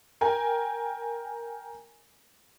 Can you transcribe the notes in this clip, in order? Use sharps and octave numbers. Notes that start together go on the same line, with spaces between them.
A#4 G5 G#5 A#5